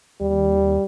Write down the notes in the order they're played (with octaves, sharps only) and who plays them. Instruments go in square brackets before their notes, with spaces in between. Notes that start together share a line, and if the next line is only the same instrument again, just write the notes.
[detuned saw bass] D#2 [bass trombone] G3